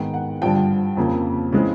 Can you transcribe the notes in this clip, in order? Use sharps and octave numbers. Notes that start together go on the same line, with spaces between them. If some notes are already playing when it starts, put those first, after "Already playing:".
Already playing: G#2 D#3 G#3 B3 G5
F#5
G2 D3 F3 G5
F2 C#3 F3 A#3
C#3 E3 G#3 C4